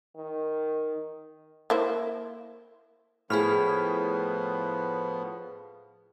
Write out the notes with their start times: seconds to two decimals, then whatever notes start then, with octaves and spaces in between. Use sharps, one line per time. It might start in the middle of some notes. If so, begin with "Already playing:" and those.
0.17 D#3
1.70 A#3 E4 C5
3.30 A2 F3 B3 G#4 B5 F6